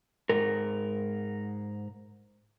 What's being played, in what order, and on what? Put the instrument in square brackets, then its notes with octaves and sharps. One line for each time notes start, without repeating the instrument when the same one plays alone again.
[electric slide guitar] G#2 A#4